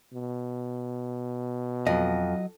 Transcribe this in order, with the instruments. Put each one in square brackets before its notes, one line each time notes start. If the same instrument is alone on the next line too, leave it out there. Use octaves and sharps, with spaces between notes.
[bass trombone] B2
[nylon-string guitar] F2 [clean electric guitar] F#3 D#5